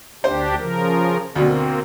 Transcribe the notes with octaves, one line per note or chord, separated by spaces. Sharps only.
D2 D4 G4 C5
C#3 F3 A#4
D2 B2 A#3 C4